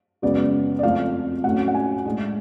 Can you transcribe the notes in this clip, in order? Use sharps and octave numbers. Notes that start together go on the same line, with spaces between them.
F#2 C#3 G#3 B3 D5
D5
F2 F3 A3 F5
A2 F#3 A3 C#4 F#5
F#5
G#5
A2 G#3 D4